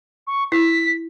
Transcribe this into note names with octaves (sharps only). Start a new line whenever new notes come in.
C#6
E4 B6